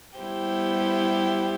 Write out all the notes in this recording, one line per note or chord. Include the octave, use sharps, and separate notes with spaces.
G3 B3 E4 G4 C5